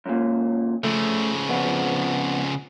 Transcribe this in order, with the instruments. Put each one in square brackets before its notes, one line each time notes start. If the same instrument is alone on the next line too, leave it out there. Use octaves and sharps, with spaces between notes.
[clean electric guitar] F#2 A#2
[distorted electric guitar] C#3 F3 [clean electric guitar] A3
[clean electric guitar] F2 B3